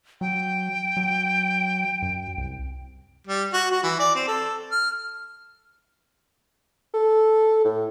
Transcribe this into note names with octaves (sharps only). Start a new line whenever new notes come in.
F#3 G5
F#3
F#2
C2
G3
F#4
F#4
E3
D5
C4
A4
F6
A4
A2